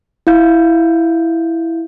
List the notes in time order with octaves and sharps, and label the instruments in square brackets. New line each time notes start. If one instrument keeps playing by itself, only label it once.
[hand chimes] E4 F5 G6